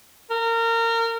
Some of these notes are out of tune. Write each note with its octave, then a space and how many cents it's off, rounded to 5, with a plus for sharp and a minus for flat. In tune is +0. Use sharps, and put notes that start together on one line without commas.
A#4 -25